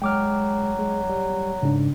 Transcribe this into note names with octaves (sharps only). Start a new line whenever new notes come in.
F#3 G#3 G5 D6 F6
G#3
G3
G#2 C#3 D4